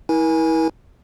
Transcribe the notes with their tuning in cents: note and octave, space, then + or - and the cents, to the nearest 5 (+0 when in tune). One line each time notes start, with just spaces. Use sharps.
E4 -30 A#4 +40 G#5 +0